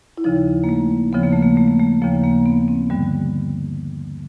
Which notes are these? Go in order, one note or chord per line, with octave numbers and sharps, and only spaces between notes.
E4
D#2 C#3 F3 D#4
A#3
A3
D#2 C#3 F3 B3
A#3
A3
A#3
A3
A#3
A3
D#2 C#3 F3 A#3
A#3
B3
C4
G2 D3 G3